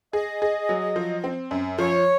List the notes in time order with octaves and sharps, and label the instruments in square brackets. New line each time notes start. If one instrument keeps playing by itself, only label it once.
[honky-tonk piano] G#4 [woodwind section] D#5
[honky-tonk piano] G#4
F#3
F3
C4
F#2
[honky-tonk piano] F3 [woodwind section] C#5